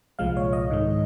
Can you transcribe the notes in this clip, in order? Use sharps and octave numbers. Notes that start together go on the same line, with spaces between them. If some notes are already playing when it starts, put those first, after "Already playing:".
C2 A#2 F3 G#3 F5
C#5
D#5
G#2 D#3 G#3